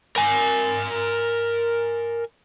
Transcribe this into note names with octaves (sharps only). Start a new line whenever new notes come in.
A#4 G#5